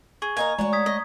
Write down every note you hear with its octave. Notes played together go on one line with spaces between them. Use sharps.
G#4 C#6
A#3 D#4 A#4 G#5
G#3 A3 D4 F#4 C#5 A#5
D#6 G#6 B6
D#5